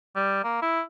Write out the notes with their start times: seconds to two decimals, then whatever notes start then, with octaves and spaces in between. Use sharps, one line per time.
0.16 G3
0.44 A#3
0.62 E4